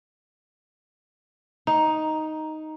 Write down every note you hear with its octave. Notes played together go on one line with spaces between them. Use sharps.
D#4 A#5